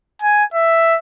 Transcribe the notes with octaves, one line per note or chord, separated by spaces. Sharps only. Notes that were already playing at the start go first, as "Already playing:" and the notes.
G#5
E5